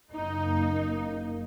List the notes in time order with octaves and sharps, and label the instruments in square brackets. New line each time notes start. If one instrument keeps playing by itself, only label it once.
[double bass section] F#1 A#3 [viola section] D#4